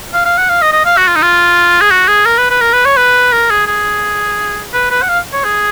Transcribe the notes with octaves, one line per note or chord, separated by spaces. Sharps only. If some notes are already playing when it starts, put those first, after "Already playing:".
F5
F5
F#5
F5
D#5
D#5
F5
F#4
F4
D#4
F4
G#4
F#4
G#4
A#4
B4
B4
A#4
B4
C#5
B4
A#4
G#4
G#4
B4
B4
F#5
F5
C#5
G#4